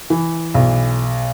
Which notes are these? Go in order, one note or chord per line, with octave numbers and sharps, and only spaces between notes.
E3
B1